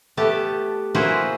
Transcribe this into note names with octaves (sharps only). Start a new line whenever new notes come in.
A3 B3 G4 A5
A#3 E4 F#4 G#4 B4 C5